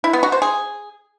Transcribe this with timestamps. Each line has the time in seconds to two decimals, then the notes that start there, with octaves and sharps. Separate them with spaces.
0.04 E4
0.13 B3
0.23 F#4
0.32 C5
0.42 G#4